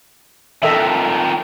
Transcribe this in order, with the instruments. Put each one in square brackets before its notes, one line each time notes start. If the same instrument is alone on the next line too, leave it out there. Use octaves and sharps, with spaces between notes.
[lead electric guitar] F2 D#3 [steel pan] A4 D#5 E5